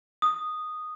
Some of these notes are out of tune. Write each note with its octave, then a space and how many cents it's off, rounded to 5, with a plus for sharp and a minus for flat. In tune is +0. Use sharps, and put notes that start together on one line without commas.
D#6 -10